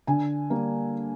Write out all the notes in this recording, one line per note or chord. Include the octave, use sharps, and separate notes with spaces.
D3 G#5
G3 A#3